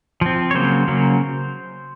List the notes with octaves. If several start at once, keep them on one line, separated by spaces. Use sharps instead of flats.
F3 C4
C#5
C#3 F#3 A#3 C5
C#3 F#3 A#3